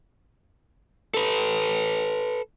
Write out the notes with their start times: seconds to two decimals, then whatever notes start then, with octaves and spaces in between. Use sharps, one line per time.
1.14 A4 B4